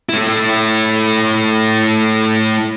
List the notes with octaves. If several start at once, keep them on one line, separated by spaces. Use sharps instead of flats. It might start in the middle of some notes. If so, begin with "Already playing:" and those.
A3 E4